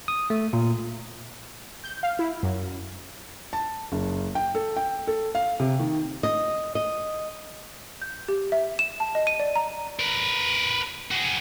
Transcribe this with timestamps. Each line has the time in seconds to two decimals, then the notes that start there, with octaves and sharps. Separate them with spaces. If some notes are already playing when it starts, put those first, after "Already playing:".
0.08 D#6
0.30 A3
0.53 A#2
1.84 G6
2.03 F5
2.19 E4
2.43 F#2
3.53 A5
3.92 F#1
4.35 G5
4.55 A4
4.77 G5
5.07 A4
5.35 F5
5.60 C3
5.79 D#3
6.23 D#5
6.75 D#5
8.02 G6
8.28 G4
8.52 E5
8.79 E7
9.00 A5
9.15 D#5
9.27 D#7
9.40 D5
9.56 A#5
10.00 A#4 B4
11.11 F#4 G#4